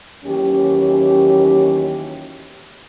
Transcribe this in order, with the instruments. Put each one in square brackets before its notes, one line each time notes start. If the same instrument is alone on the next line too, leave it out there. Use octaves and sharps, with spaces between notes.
[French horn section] D#2 E3 F#3 C#4 G4